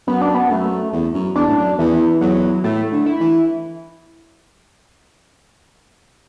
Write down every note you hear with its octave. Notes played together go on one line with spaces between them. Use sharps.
F#2 B3
D4
B3
F#2 A3
E2
F#2
E2 D4
A2
F#2
E2 E3
E2 F#3
A2 A3
D3
E4
E3